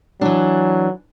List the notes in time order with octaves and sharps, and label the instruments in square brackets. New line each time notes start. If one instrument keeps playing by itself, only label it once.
[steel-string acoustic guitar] E3 D4 [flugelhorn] F#3